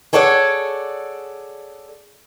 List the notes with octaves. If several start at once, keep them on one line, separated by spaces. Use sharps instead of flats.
G#4 A4 C#5 D5 F5 F#5